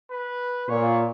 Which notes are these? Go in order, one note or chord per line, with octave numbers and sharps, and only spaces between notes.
B4
A#2 C#5